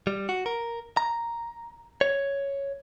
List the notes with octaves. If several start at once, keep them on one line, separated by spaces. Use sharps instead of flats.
G3
F#4
A#4
A#5
C#5